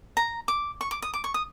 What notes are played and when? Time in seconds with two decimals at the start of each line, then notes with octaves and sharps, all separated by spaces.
0.17 A#5
0.48 D6
0.81 C#6
0.91 D6
1.02 D#6
1.14 D6
1.24 C#6
1.34 D#6